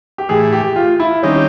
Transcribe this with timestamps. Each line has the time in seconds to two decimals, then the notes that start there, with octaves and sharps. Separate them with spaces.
0.18 G4
0.29 A2 E3 A3 G#4
0.52 G4
0.76 F4
1.00 E4
1.23 D#3 G3 C4 C#4 D#4 G4